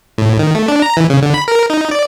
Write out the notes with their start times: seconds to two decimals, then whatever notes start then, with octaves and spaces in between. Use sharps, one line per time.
0.18 A2
0.39 D#3
0.55 A3
0.68 D4
0.82 A#5
0.97 E3
1.10 C#3
1.22 D3
1.34 B5
1.48 A#4
1.70 D#4
1.91 D5